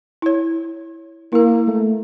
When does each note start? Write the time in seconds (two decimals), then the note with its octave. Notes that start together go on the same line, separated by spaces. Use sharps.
0.22 E4 C#5
1.33 A#3 E4 A#4
1.68 A3